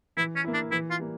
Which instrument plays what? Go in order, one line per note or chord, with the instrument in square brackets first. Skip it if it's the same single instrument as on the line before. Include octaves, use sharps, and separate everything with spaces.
[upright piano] E3 [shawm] E4
[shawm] C#4
[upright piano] A#3 E4
[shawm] D4
[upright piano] E3 [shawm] E4
[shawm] F4
[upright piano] G3 A#3